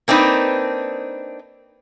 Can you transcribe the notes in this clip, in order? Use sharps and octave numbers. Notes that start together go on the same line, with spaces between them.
A#3 C4 D4 D#4 B4